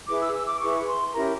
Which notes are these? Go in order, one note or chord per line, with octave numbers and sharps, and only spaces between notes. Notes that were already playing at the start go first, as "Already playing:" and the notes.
E4 G#4 B4 D6
E6
E6
D6
E4 G#4 B4 C#6
C6
C#4 E4 G4 A#4 A#5